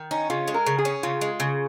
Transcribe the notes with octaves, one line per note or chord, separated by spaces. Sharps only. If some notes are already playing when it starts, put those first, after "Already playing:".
Already playing: D#3
C#4 D#4
C#3 F4
G#3
A#4
C#3
G#4
C#4
C#3 F4
G#3
C#3